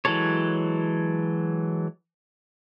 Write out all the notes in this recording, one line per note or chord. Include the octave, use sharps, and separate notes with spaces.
E3 F#3 G#3 A4 C#5